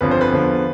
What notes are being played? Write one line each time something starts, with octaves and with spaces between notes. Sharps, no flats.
G1 F2 D3 F3 B4
C5
B4
E2 D3 F3